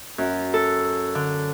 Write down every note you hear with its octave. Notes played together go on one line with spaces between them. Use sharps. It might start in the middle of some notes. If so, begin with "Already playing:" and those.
F#2
A4
D3